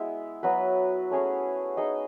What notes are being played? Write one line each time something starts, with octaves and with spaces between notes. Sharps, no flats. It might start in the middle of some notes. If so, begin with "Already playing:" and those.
Already playing: G#3 B3 E4
F#3 B3 F#4 B4
A3 C#4 G#4 C#5
D#4 G#4 D#5